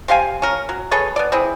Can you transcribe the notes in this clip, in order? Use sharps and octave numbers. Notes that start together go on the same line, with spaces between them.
C4 G4 F5 G#5
C#4 A#4
F#3
G#4 A4 B4 C#5
B3 D5
C4 E4 G#4